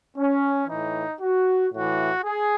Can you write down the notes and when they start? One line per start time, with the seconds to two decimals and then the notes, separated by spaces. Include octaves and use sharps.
0.17 C#4
0.68 A2 E3 D#4
1.20 F#4
1.72 A2 E3 F#4
2.24 G#4